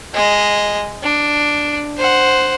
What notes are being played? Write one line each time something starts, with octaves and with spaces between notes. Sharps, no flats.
G#3 D#5
D4
C5 F#5